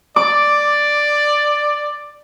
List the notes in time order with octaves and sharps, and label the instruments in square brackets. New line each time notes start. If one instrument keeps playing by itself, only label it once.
[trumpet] D5 [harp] D6